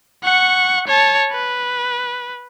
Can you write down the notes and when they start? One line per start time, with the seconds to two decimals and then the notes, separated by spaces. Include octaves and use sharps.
0.24 F#5 C#6
0.88 C#5 A5
1.32 B4